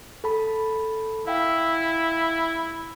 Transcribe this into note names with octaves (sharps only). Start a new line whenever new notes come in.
A4 A5 B5
E4 F5 G5